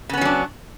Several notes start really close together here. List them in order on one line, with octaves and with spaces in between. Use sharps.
C#3 B3 C#4 F#3 D4